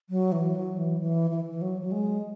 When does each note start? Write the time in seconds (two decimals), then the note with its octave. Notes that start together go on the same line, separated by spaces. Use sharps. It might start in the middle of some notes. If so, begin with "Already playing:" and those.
0.10 F#3
0.32 E3
0.55 F#3
0.78 E3
1.01 E3
1.31 E3
1.51 E3
1.62 F#3
1.81 F#3
1.92 G#3